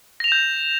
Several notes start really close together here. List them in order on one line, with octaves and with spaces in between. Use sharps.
A#6 F7 E7 G6